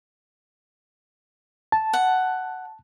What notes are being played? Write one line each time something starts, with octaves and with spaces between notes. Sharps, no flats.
A5
F#5